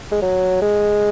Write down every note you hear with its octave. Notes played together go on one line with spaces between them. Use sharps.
G#3
F#3
G#3